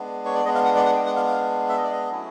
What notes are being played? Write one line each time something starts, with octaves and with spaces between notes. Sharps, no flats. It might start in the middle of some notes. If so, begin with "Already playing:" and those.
Already playing: G#3 B3 D4
C#5
D5
G#3 B3 D4 D#5
F5
F#5
D5
F#5
G5
F#5
F5
F5
E5
D#5
D5
D#5
F#3 A3 C#4 E4